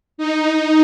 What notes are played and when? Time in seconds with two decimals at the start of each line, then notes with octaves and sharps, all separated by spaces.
0.18 D#4